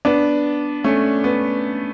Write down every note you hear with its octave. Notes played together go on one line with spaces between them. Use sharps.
B3 D4
A3 C#4
B3